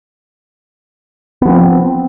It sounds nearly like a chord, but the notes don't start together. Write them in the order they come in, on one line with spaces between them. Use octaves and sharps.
B3 F3 C4